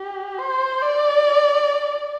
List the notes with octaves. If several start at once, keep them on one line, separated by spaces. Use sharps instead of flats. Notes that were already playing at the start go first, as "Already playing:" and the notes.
Already playing: G4
C5
D5